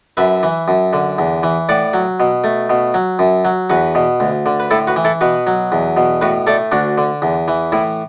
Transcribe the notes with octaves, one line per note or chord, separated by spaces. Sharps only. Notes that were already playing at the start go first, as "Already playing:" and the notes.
F#2 B4 E5
E3
F#2
D3
E2
E3
A2 D5 F#5
F#3
B2
A3
B2
F#3
F#2
F#3
E2 F#4 B4
B2
D2
D3
B4
A2 E4 A4
F#4 B4
E3
E4 A4
B2 F#4 B4
F#3
E2
B2
A2 F#4 B4
A3 A4 D5
D2 D4 F#4
D3
E2
E3
A2 E4